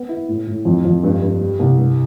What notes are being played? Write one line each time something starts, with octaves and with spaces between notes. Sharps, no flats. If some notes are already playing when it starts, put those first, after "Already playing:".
Already playing: B3
E4
A2
A2
F2
F2
G2
G2
G3
C2
G2